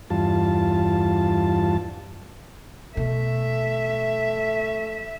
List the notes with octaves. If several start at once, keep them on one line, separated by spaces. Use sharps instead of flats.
E2 G2 F4 A5
B2 A3 E5